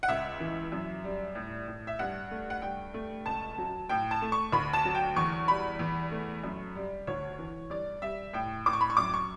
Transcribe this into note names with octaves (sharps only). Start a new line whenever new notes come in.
F#5
C#2 E5
E3
F#2
G3
A2
A2
E5
G2 F#5
A3
F#5
G2 G5
A3
C#2 A5
F#3
A2 G5
A5
A3
C#6
D2 B5
A5
F#3
G5
E2 C#6
G3 B5
E2
A3
F#2
G3
D2 C#5
E3
G2 D5
G3 E5
A2 G5
A2 D6
C#6
B5
C#6
F#2 D6
C#6